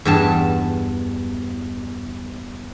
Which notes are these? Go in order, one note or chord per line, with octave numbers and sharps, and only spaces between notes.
E2 G2 A5